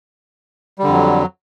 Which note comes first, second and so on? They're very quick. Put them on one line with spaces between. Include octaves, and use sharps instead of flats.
G3 D3 F2 F#3